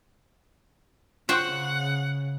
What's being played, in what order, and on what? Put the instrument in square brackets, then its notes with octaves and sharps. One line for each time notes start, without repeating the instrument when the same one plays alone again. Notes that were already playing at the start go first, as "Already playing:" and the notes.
[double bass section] C#3 [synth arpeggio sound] F4 C6 [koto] F#4 C5 G5 [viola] F#5